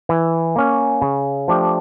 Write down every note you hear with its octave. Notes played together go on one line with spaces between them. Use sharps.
E3
A#3 C#4
C#3
F3 A3 D4 G4